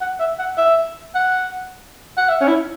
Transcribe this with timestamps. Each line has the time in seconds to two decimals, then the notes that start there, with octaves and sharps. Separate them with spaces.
0.01 F#5
0.19 E5
0.39 F#5
0.57 E5
1.14 F#5
2.17 F#5
2.29 E5
2.40 C#4
2.48 E4